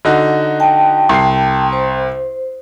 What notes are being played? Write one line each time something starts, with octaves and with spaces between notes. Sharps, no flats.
D3 D#4 F#4
G5 A5
C2 C7
C5